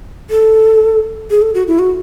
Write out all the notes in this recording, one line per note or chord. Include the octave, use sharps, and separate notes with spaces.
A4
G#4
A4
F#4
E4
F#4